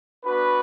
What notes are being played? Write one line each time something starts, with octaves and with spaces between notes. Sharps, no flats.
B3 D4 F#4 B4